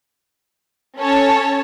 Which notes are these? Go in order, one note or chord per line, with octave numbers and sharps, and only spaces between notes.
C#4 A4 C#5 A5